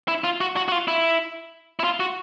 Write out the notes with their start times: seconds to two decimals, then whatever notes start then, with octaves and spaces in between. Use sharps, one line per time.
0.08 E4
0.24 F4
0.41 F#4
0.56 F#4
0.68 F#4
0.72 F4
0.88 E4
1.80 E4
1.84 F4
2.00 F#4